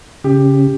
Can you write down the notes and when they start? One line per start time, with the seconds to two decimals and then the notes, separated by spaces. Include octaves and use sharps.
0.24 C#3 G4